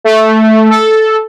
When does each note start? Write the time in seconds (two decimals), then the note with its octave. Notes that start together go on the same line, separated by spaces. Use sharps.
0.04 A3
0.69 A4